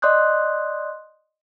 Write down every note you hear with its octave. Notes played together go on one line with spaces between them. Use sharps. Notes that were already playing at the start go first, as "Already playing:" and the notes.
D5 D#5 C6 D#6 F#6 G6